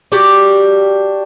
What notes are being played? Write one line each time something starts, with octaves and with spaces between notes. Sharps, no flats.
D4 F#4 G4